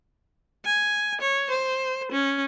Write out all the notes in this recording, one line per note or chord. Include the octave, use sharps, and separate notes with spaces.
G#5
C#5
C5
C#4